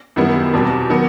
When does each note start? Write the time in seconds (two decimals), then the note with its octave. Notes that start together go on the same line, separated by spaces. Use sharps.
0.16 F#2 D#3 G3 B3 E4
0.53 E2 B2 G3 C4
0.89 D#3 F#3 B3